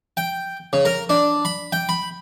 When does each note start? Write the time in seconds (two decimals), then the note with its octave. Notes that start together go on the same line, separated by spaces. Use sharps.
0.17 G5
0.73 C#3
0.85 A#4
1.09 D4
1.45 B5
1.72 G5
1.89 B5